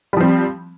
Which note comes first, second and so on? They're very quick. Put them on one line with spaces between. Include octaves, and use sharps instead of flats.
G3 F3 C4